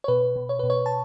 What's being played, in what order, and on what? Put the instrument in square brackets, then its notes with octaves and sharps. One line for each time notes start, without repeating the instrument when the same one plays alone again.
[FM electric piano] C#5
B2 B4
B2
C#5
B2 B4
C#5
A5